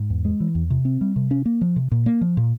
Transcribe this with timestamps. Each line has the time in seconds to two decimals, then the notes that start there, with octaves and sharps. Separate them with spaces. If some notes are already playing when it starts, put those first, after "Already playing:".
Already playing: G#2
0.10 E2
0.25 G#3
0.40 E3
0.55 E2
0.70 C3
0.85 C4
1.01 G3
1.16 C3
1.31 C#4
1.46 A#3
1.61 F3
1.76 C3
1.92 A#2
2.06 A#3
2.21 F3
2.37 A#2